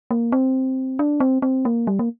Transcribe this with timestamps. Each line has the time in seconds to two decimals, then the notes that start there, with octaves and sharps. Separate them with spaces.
0.11 A#3
0.32 C4
0.99 D4
1.20 C4
1.42 C4
1.65 A#3
1.87 G3
1.99 A#3